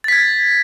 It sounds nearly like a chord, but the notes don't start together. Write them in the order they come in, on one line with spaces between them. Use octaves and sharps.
A6 B6 G#6